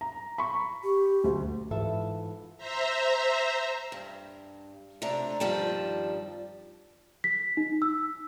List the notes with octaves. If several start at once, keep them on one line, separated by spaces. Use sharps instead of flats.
A#5
B5 C#6
G4
D2
G#2 E3 F4 A4 E5 A5
C5 E5 A#5
G2
C3 A3 D4 A#5
G2 D#3 F3 G3 C4 A5
B6
D#4
E6